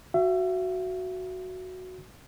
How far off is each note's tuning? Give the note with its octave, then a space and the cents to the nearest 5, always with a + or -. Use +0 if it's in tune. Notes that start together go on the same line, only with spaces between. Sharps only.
F#4 +0 E5 +35